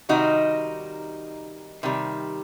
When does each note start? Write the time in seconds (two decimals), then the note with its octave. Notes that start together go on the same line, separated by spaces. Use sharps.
0.09 C3 D#3 G3 D#4 F#4
1.83 C3 D#3 G3